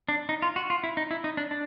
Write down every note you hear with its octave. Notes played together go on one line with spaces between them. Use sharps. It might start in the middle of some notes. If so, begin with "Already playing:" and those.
D4
D#4
F4
F#4
F4
E4
D#4
E4
D#4
D4
D4